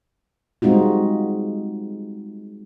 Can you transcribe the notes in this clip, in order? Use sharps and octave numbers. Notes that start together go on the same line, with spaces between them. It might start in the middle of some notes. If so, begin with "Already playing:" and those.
G3 G#3 C4 D#4 F4 F#4